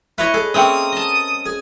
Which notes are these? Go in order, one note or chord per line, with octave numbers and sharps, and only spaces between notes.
E4 B4 C#5 D#5
G#4 A4
A#3 C4 C#4 A#4 E5 G5 D#6
D#5 A5
G#4